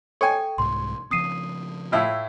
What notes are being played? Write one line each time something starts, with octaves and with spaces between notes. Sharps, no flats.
A4 C#5 G5 G#5
C2 G#2 C6
C#3 F3 C4 D#6 C7 D#7
A2 E4 F4